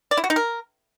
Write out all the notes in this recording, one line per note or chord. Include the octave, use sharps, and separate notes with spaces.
D5
E4
F#4
D#4
A#4